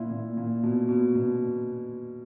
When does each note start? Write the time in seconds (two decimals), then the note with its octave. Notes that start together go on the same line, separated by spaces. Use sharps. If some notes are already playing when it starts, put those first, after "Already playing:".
Already playing: A#2 E4
0.11 A#2
0.37 A#2
0.63 B2
0.89 B2
1.15 B2